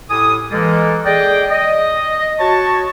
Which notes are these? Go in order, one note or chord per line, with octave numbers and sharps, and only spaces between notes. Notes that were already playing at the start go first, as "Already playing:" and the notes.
A2 G4 A4 G#5 D#6
E3 G#3 A#3 A4
G#4 D5 D#5 G5
D#5
F#4 C#5 A5 C#6